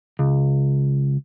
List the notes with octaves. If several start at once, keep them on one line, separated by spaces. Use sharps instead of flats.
C#2